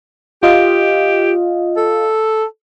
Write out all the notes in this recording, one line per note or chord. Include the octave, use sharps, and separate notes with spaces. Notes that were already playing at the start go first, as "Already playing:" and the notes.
F4 G4 D#5 F5
A4